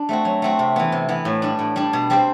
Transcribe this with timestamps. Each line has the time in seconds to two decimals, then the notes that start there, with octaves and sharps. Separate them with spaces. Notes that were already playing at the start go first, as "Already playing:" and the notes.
Already playing: D4
0.09 A3 C4 F#4
0.25 F#3
0.42 A3 C4 F#4
0.59 C3
0.76 E3 B3
0.92 C3
1.09 E3 B3
1.25 A2
1.42 G3 D4
1.59 A2
1.76 G3 D4
1.93 B2
2.10 G3 C4 G4 C5